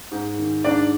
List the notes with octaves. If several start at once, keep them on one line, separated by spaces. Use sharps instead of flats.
G#2
D#3
G#2 D4 D5